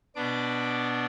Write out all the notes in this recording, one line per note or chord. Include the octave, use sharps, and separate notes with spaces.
B2 B3 D4 D6